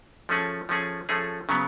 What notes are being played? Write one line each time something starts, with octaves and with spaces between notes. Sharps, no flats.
F3 A3 C#4 G#4
F3 A3 C#4 G#4
F3 A3 C#4 G#4
C#3 F#3 B3